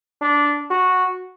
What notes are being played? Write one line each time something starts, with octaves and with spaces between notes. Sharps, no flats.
D4
F#4